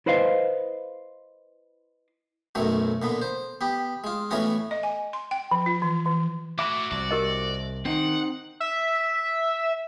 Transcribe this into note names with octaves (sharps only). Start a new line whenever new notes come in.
E4 B4 C5 D#5 F5
B1 F#2 F#3 A3
A#2 D3 B3
C5
B3 G4
G#3 F4
A2 E3 B3 C#4 F#4
D#5
G#5
C6
G5
F3
F4
E3
E3
A3 E4 F#4 E5 B5 D6
C2 D5
G4 A#4 D#5
D#3 C4 D#4 F#5
E5